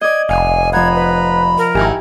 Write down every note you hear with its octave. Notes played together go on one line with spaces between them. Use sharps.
D5 D#5 G#6
F1 F5 G#5
F3 F#5 A#5 B5 G#6
B4
A#4
G#1 D#4 E4 G4 G#5